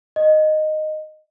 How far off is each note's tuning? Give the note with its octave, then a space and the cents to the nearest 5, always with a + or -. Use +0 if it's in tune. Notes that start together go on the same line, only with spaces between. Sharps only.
D#5 -10